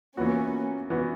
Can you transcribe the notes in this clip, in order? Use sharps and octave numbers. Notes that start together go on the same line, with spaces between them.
E3 A#3 B3 C#4 F#4
E3 B3 F#4